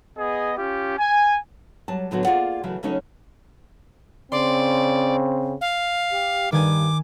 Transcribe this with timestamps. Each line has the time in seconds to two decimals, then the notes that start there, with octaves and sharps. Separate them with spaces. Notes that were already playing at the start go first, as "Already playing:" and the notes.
0.17 B3 G#4 D#5
0.58 C#4 F4 G4
0.98 G#5
1.88 F#3 G3 A5
2.11 A2 D3 F#3 B3 F#4
2.24 A#3 F4 G#4 D5 F#5
2.63 C#3 E3 F#3 A3
2.83 C#3 F#3 A3 C#4 D#4 C#5
4.32 C#3 C4 D5 C6
5.61 F5
6.12 G4
6.52 G2 D#3 G#5 D6